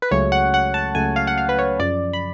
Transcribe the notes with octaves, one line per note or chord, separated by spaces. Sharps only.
B4
C#2 C#3 F#3 A3 C#5
F#5
F#5
A5
C#2 C#3 F#3 A3 G#5
F5
F#5
F5
B4
C#5
F#2 C#3 F3 D5
B5